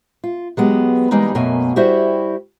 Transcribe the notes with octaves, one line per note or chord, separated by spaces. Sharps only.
F4
F#3 G#3 B3 G4
E3 G3 G#3 A#3 D#4
F#2 B2 A3 A#3 E5 G#5
G3 E4 F#4 G4 C5 E5